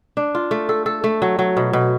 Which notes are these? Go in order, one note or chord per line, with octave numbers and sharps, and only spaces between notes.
D4
F4
A3
A4
A4
A3
F#3
F#3
B2
B2